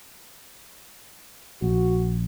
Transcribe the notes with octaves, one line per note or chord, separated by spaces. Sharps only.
A#1 F#4